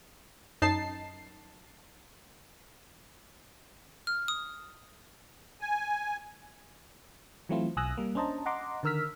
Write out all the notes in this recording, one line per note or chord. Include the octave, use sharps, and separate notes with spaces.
F#2 D#4 A5 C7
F6
D#6
G#5
E3 F#3 A3 C4 E4 F4
B1 G#5 D#6 E6 F#6 A#6
G3 A#3
C#4 D4 C5 D#5 A5 A#5
D#5 F#5 A#5 C6 D6
D3 D#3 A#4 E6 F6 B6